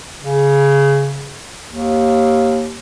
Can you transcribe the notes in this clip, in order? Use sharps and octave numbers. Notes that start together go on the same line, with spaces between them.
C#3
D#2